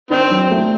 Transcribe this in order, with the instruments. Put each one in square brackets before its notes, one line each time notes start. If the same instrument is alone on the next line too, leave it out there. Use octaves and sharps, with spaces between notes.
[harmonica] D#3 C4 [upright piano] D4
[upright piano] F#3
A3